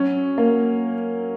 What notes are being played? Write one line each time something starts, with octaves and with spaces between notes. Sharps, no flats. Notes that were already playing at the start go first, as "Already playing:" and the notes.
Already playing: F#3 C#4
A#3